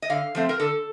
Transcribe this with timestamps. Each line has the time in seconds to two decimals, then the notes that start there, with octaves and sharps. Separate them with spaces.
0.02 D#5
0.10 D3 F5
0.35 F3 A3 C4
0.49 A#4
0.59 D3 A4